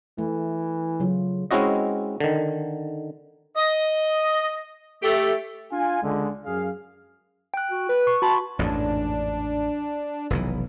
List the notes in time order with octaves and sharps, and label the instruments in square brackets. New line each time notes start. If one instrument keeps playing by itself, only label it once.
[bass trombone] E3 [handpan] A3
[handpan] C#3 F#3 F4
[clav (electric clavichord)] G#3 C4 C#4 E4 F#4 D#5
D3 D#3
[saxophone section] D#5
A3 G4
[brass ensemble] D4 F4 G#5
C#2 D3 G#3
F#2 G#4 F5
[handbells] G5 F#6
[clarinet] F#4
B4
[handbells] C#6
[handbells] F#4 B5 C6 [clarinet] A5
[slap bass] A1 F2 G#2 [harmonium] D4
[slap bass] F1 B1 E3